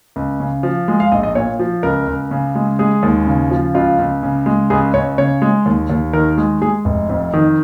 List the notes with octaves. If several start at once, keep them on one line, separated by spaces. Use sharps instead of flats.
C#2
C#3
F3
G#3
F5
A#1 D#5
D#5
A#2 C#5
F3
C#2 A#4
C#2
C#3
G#3
G#3 G#4
D#2
C#3
F3
C#2 F4
C#2
C#3
G#3
C#2 G#4
C#2 C#5
C#3 C#5
G#3
D#2
D#2
D#3 A#4
G#3
G#3 G#4
F1
F2
D#3